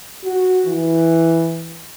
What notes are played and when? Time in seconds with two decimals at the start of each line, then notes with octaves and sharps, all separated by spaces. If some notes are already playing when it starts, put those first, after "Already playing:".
0.24 F#4
0.66 E3